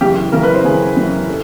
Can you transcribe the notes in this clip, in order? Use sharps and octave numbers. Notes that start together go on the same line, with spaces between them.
F#2 C#3 E3 G4
F#2 C#3 E3 A#4
B4
C5
F#2 C#3 E3 G#4
F#2 C#3 E3
A4